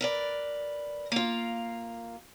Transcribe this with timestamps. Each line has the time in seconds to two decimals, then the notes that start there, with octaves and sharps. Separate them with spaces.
0.01 A#4 B4 D5
1.12 A#3 F4